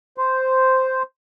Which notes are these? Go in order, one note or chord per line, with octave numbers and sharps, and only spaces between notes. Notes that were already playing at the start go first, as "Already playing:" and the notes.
C5